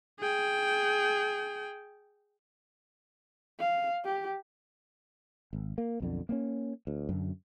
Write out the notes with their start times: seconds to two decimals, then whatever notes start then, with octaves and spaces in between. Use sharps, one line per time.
0.20 G#4 G5
3.60 F5
4.05 G4
5.53 G#1
5.78 A#3
6.00 B1 F2 D3
6.29 A#3 B3 C#4
6.87 D2
7.09 F#2 D3